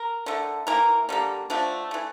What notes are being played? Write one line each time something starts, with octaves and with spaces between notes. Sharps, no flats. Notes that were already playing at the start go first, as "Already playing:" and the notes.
Already playing: A#4
D3 A3
E3 A#3 A#4
D3 G3 A#3
D3 F3 A3 D4
E3 A3